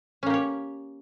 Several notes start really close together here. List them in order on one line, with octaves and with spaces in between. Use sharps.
C#4 A#3 G4 C#5